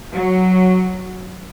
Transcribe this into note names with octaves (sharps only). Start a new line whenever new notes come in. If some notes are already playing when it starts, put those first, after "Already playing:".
F#3